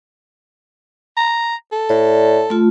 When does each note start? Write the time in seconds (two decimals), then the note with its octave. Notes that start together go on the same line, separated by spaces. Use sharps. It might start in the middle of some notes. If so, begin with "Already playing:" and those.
1.17 A#5
1.72 A4
1.89 A2 D5
2.50 A3 F4